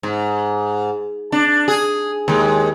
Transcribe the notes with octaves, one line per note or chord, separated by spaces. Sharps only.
G#2
D4
G#4
D#2 G#3